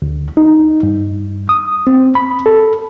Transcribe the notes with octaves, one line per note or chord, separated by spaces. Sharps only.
D2
D#4
G2
D#6
C4
B5
A4